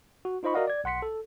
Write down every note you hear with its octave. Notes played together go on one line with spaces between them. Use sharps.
F#4
D#4 F4 C5 D#5 B5 C#6
F#4 A#4 D5 D#5 F5 F#5
D5 G#6
B1 F#5 C6 B6 C#7
A4